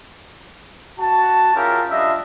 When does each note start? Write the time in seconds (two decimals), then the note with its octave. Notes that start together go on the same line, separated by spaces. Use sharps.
0.99 F#4 A5
1.55 C#4 E4 F4 G4 G#4 A#4
1.91 G3 D4 F4 D#5 E5